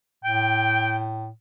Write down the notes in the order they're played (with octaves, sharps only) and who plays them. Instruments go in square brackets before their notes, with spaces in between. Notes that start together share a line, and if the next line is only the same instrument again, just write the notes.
[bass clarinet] A2 [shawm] G5